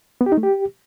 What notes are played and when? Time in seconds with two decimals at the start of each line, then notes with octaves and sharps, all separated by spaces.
0.21 B3
0.26 G4
0.32 D#4
0.38 A3
0.43 G4